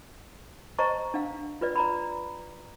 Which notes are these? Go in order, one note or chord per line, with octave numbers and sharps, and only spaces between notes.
C5 D#5 A5 A#5 C#6
D4 F5
F4 B4 D5
D5 A#5 B5